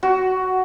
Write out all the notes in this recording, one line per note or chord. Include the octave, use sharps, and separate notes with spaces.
F#4